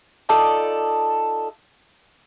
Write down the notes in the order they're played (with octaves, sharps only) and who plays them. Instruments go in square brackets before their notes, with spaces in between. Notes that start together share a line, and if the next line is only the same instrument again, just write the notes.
[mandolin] D#4 F4 A4 D5